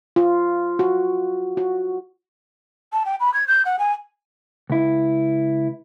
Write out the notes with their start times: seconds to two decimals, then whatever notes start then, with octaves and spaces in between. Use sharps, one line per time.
0.16 F4
0.79 F#4
1.57 F#4
2.93 A5
3.06 G5
3.20 B5
3.34 G#6
3.48 G6
3.65 F#5
3.79 G#5
4.70 C#2 E4